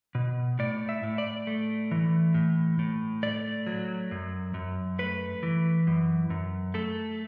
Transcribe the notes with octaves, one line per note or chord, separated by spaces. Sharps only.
B2
A2 D5
E5
A2
D5
A3
E3
A2
A2
A3 D5
F#3
F#2
F#2
A3 B4
E3
F#2
F#2
A3 A4